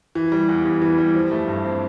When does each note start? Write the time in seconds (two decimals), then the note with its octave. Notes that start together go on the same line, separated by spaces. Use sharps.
0.15 E3
0.32 G3
0.49 E2
0.65 E2
0.82 E3
0.98 G3
1.14 F3
1.31 A3
1.48 G2
1.64 C4